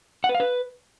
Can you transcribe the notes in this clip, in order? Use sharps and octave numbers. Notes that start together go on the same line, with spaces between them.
F#5
B4
F5
B4